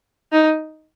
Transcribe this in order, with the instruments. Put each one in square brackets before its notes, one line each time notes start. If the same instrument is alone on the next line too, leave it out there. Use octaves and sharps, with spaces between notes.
[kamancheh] D#4